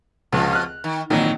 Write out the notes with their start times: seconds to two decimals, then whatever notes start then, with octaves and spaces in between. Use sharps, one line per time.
0.32 C#2 B2 F3
0.53 F6 F#6
0.84 D#3
1.10 G#1 A#2 D#3 E3 F#3